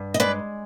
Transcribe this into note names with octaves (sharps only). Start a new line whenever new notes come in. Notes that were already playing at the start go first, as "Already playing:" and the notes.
Already playing: G2
D#5
G#3 B4 D5